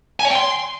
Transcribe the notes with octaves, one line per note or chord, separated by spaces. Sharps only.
G#5
C#5
G5
C6